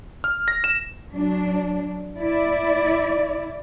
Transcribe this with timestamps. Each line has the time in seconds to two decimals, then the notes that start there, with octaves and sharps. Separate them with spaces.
0.24 F6
0.48 A#6
0.64 E7
1.09 F#3 D4
2.18 E4 D5